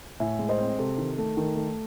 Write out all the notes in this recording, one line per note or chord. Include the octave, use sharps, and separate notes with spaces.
A2 E5 G#5
G#3
C5 D#5
C4
C3 A4
D#3
A3
D#3
A3